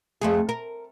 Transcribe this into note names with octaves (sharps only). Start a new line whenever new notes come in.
F2 A3 G#4
A#4